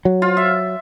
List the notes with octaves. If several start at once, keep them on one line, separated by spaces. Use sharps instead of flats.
F#3
F4
E5